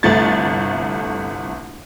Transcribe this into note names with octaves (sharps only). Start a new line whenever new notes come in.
G1 C2 A3 A6